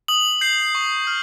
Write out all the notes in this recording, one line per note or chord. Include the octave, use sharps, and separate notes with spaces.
D#6 F#7
G6 C7
C#6
F6